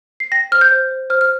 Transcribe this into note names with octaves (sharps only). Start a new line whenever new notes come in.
C7
G5 A#6
C5 F6
G6
C5
C5
C5 F6
F6